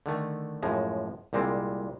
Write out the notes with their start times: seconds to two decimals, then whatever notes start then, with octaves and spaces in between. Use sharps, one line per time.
0.06 D3 D#3 A3
0.63 F#2 A2 F3 G#3
1.33 C2 A#2 G3 G#3 C4